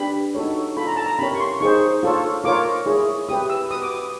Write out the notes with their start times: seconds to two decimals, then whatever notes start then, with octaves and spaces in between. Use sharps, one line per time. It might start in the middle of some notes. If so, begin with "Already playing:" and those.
Already playing: D4 G4 B4 B5
0.34 D#4 F#4 A4 C#5
0.77 F4 A4 C#5 B5
0.87 A#5
0.96 A5
1.06 A#5
1.19 C#4 E4 G4 A#4 C#5 B5
1.34 C#6
1.40 C6
1.60 D#4 G#4 C5 C#6
2.03 F4 A4 C#5
2.44 F4 A#4 C#5 D6
2.86 E4 G#4 C#5
3.29 E4 G4 B4 D#6
3.50 E6
3.70 F#4 B4 D#6
3.82 D6
3.94 D#6